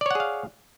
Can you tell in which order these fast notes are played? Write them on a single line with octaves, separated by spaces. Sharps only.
D5 C#5 F#5 G#4 F5